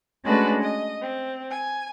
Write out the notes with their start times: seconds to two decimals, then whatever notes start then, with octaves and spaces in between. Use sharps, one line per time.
0.25 G#3 A3 C#4 D4 F#4 B4
0.61 D#5
1.01 C4
1.50 G#5